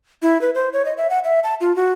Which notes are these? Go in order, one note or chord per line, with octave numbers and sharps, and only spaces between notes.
E4
B4
C5
C#5
D#5
E5
F#5
E5
A5
F4
F#4